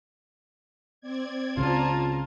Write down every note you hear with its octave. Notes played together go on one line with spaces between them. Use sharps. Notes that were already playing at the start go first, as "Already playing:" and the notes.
C4 D5 G#6
C#2 C#3 F4 A5 A#5